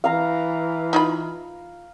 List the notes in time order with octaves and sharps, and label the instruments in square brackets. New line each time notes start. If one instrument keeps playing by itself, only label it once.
[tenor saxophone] E3 [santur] F5 A#5
[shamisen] D#4 F4 B5